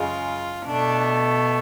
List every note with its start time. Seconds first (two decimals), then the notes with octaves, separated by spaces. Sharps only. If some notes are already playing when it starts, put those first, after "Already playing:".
Already playing: F#2 C#3 G#3 F4
0.66 B2 A3 D4